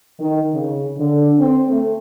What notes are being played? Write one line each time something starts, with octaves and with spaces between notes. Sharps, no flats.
D#3
C#3
D3
C4
A3